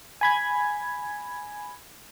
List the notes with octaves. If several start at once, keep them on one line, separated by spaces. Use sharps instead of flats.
G#5 B5 G#6